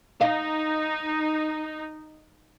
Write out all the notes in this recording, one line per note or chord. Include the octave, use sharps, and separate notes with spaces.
D#4 D#5 F5